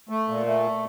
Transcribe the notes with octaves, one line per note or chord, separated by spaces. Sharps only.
A3
A#2
A3